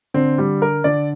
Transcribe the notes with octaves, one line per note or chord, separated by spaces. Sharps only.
D3 C4
G3
A#4
D3 D5